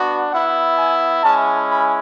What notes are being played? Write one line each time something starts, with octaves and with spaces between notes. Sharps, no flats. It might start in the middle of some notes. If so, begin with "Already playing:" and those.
Already playing: B3 D4 F#4
B3 E4 F#5
G#5
G#3 C#4 E4 A5
B5